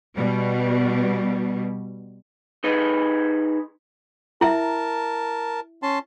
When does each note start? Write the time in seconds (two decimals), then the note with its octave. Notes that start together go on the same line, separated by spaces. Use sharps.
0.16 B2 G3
2.64 D#4 G#4 B4 D#5
4.41 E4 A#4 E5 A5
5.83 C#4 A5 C6